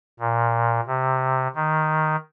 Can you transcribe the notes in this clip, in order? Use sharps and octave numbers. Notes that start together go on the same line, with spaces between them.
A#2
C3
D#3